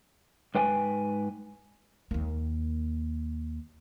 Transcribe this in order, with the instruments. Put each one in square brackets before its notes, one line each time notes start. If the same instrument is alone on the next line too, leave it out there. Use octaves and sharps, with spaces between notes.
[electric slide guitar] G#2 B4 G5 G#5
[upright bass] D#2 A#3